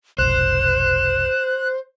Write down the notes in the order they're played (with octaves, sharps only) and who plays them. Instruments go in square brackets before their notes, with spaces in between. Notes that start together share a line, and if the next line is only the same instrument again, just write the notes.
[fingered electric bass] F1 B1 [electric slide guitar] C5 [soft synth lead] F#6 [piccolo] E7